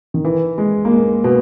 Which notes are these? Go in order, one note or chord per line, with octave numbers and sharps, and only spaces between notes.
D#3
E3
G#3
A#3
G#3
B2